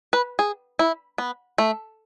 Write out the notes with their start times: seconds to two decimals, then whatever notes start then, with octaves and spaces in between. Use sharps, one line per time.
0.13 B4
0.39 G#4
0.79 E4
1.18 B3
1.58 A3